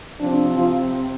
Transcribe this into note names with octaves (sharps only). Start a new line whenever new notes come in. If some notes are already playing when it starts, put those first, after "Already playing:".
C3 F3 C4 D4
F3 F4